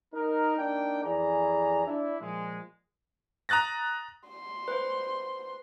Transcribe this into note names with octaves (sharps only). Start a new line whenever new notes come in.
D#4 A#4
A#3 D4 D#4 G5
F2 E3 G#4 D5 A#5
D4 E4
A#2 F3 G#3
A#5 D#6 F#6 A6 A#6
C6
B4 C5